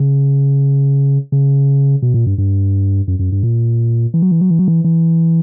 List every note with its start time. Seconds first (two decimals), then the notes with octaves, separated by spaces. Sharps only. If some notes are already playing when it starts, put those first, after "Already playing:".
Already playing: C#3
1.32 C#3
2.02 B2
2.14 A#2
2.26 G2
2.38 G2
3.08 F#2
3.19 F#2
3.32 G2
3.43 A#2
4.14 E3
4.22 F#3
4.31 E3
4.41 F#3
4.50 E3
4.59 F#3
4.68 E3
4.84 E3